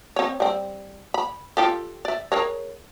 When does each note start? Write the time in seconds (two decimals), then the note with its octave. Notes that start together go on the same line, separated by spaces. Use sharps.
0.16 C4 C#5
0.40 G3 C4
1.14 B5
1.57 F4 G4 A4
2.05 D5 E5
2.32 G#4 A#4 C#5